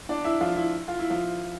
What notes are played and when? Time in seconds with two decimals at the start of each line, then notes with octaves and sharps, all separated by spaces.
0.09 D4 D5
0.24 E4 E5
0.41 F3 F4
0.56 E4
0.88 F4
0.99 E4
1.10 F3 F4